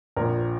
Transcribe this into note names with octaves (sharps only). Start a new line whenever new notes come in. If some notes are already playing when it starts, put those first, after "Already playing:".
A#1 A#2 F3 A#4